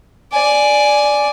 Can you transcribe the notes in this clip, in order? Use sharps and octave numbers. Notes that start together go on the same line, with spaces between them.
D5 G#5